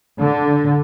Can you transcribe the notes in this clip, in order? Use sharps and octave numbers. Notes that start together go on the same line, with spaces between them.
D3